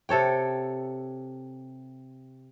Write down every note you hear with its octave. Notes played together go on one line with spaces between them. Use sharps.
C3 A4 C#5 G5